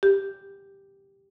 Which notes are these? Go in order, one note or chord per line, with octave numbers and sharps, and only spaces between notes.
G4